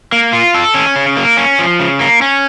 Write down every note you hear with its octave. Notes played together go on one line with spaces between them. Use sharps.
A#3
F4
A4
C#4
C#3
A#3
C#4
F3
C#3
A#3
C#4